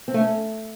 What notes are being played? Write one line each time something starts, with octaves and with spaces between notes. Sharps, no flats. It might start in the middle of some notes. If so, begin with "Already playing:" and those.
C4
A3
C#4